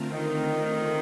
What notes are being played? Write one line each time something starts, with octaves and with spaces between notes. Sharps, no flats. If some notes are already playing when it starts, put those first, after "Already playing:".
Already playing: D3 A3 C4 F4 A#4
D#3